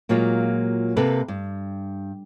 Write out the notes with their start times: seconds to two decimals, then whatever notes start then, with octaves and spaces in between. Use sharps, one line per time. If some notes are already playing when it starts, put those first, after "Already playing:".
0.09 A#2 F#3 G#3 A#3 F4
0.96 C3 A#3 A4 B4
1.28 G2